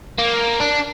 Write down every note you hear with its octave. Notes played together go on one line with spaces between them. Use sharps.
A#3
D4